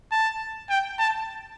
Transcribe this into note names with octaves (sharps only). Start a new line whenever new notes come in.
A5
G5
A5